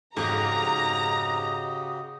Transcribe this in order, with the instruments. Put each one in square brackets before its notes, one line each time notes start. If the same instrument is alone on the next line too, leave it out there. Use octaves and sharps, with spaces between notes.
[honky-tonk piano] G#1 F2 G#2 [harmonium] C#3 F#4 G4 [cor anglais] D#5 [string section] A#5